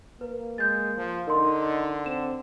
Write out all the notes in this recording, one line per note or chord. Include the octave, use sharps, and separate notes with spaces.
A#3 B4
G#3 G6 A6
F3
D3 D#4 A#4 C6
C4 E7